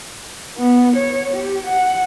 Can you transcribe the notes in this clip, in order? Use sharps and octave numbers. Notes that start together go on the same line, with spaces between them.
B3
C#5
G4
F#5